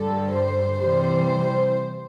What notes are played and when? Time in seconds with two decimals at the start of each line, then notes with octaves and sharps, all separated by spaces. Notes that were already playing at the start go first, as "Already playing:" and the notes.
Already playing: G2 D3 G3 A4
0.33 C5
0.80 C3 E3 G3 C5